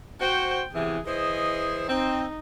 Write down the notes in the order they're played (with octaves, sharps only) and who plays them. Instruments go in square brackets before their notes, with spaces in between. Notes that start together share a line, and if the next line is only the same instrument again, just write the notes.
[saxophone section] F#4 C5 [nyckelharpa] G5
[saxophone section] E2 C3 E3 [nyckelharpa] G#4
[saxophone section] E3 G#4 C5 [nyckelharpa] D#5
[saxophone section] C4 [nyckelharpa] D#4